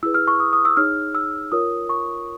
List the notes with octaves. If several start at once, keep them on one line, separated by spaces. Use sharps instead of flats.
E4 G#4 B4 E6
F6
C#6
D#6
D#6
E6
D#4 G#4 C#5 F6
E6
F4 A#4 C#5 D#6
C#6